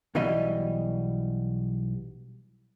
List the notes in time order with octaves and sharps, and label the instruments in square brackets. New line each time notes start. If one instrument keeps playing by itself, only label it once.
[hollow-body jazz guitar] B1 B2 E3 G3 D#5